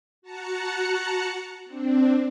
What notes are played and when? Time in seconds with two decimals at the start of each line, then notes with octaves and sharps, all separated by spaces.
0.22 F#4 A5 A#5 F#6 C#7
1.66 C4 D4